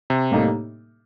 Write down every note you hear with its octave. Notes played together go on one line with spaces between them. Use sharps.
C3
A2 G3 A#3 D#4 A4